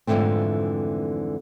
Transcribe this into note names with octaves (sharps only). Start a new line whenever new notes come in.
F2 G#2 D3 E3 A3 C4